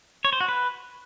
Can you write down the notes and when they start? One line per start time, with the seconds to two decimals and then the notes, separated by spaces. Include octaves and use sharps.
0.25 C#5
0.33 C5
0.40 F#4
0.48 B4